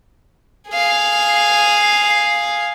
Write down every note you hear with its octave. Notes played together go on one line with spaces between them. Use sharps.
G#4 F5